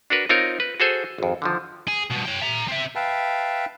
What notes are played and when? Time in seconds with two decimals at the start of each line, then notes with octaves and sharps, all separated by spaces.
0.10 D4 F#4 A#4 B4
0.29 C4 D#4 F4 A#4 C#5
0.60 B4
0.80 F#4 G#4 A4 C5 G#5
1.18 G#1 F2
1.42 D3 D#3 F3
1.88 G#4
2.11 G2 B2
2.26 C#5 G5
2.42 E5 A#5
2.68 C4 E5
2.95 B4 E5 F5 G5 A5